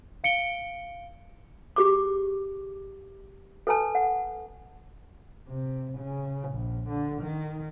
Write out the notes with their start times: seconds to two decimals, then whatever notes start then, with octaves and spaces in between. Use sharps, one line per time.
0.24 F5 C#7 D7 G7
1.76 G4 G#4 D6
3.67 A4 B4 G#5 A5
3.95 F#5
5.48 C3
5.99 C#3
6.50 A#1
6.89 D3
7.22 D#3